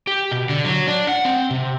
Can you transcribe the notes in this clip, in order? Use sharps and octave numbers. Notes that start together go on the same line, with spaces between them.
G4
B2
D3
F#3
D4
F#5
C4
C3